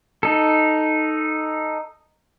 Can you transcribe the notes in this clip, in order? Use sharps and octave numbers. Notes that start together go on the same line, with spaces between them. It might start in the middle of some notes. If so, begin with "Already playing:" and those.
D#4 A4